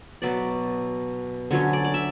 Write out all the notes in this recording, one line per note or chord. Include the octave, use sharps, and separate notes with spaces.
B2 F#3 B3 D5
D3 F#3 C#4 C#5
D5
D5
E5